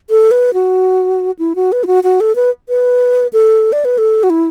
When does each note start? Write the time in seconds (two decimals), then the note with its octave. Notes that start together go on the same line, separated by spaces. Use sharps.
0.10 A4
0.31 B4
0.54 F#4
1.39 E4
1.56 F#4
1.72 B4
1.84 E4
1.87 F#4
2.04 F#4
2.20 A4
2.36 B4
2.69 B4
3.33 A4
3.73 D5
3.85 B4
3.98 A4
4.23 F#4
4.30 E4